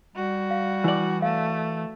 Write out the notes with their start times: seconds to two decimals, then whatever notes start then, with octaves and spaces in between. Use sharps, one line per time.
0.16 G3 F#4
0.51 F5
0.84 E3 E4 D5 F#7
1.22 A3 F5